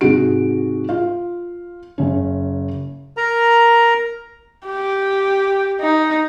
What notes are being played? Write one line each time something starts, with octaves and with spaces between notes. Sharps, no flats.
G#2 C3 G#3 F#4 D7
F4 F5
F#1 C#4
A#4 A#5
G4
D#4